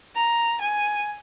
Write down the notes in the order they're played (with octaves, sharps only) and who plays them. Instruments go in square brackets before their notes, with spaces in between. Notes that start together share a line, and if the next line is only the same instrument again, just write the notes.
[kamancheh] A#5
G#5